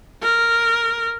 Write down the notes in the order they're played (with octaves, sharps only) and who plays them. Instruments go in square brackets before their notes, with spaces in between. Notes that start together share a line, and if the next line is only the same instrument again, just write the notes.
[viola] A#4